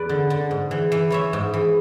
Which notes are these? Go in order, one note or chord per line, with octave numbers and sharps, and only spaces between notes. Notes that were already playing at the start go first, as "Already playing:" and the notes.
Already playing: E2 B4 D5
D3
D3
G#2
E3
E3
E3 C#5 E5
G#2
E3